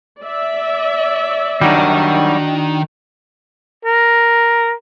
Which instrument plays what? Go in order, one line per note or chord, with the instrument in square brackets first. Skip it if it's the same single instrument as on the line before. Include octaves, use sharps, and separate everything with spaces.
[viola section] D5 E5
[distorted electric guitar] D#3 [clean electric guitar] F#3 G3 [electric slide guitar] D4 D#4 F#4
[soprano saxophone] A#4